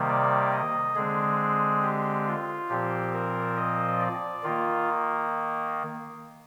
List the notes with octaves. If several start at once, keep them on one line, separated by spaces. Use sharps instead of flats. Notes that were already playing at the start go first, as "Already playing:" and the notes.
Already playing: C3 D#3 G3 A#3
D5
D#5
D3 G#3 C4 G#4
G4
F4
A#2 F3 C4 G4
A#4
D#5
D5
D#3 A#3 F4